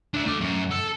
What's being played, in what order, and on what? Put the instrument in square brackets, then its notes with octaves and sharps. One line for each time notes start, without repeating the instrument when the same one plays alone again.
[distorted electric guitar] D4 E5
A3 D5
F#2
A4